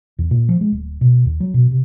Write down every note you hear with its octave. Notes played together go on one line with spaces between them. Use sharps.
E2
A#2
F3
G#3
D1
B2
D#2
F#3
B2
C3